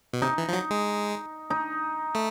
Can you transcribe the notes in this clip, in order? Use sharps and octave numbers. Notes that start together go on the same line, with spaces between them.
B2
C3 D#4
E3
F3
F#3
G#3
D#4
A3